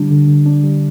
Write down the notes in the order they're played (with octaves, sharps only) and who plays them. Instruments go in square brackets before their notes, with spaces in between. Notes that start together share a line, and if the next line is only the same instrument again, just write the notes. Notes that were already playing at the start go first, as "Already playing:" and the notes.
Already playing: [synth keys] D3 G3 D4
D3
D3
D4
G3